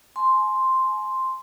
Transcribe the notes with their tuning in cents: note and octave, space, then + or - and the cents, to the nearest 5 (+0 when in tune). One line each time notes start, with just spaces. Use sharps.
G#5 +30 C6 +0